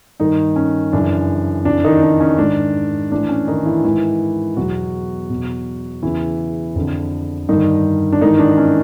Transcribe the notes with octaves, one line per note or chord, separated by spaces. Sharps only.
G2 D#3 D#4
C#4
F#2 C#3 E3 D4
F2 C#3 E3 D4
D#3 D#4
D4
C#4
G#2 D#3 D4
A2 E3 D4
C#4
D#3 D#4
E3 E4
G#2 D#3 E3 E4
E2 B2 F#3 F#4
E2 B2
E2 C#3 E3 E4
F2 D3
G2 D3 D#3 D#4
D4
G#2 D#3 E3 D#4
D4
C#4